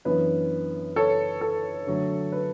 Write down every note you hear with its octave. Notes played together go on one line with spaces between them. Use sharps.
F#2 E3 B3 D4 B4
A4 C#5
A4
D3 F#3 A3
B4